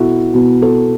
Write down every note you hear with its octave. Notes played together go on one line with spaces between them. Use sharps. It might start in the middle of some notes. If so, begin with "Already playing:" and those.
Already playing: B2 B3 E4 F#4 A4
B2 B3 F#4
A4